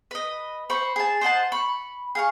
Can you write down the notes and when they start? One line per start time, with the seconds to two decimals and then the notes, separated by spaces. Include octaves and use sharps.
0.11 B4 D#5
0.70 C5 B5 C#6
0.96 G#4 A5
1.21 C5 D#5 F#5 A5
1.52 B5 C#6
2.15 G#4 F5 C#6